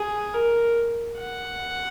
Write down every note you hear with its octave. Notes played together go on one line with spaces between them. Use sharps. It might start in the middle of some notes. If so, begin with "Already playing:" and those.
Already playing: G#4
A#4
F#5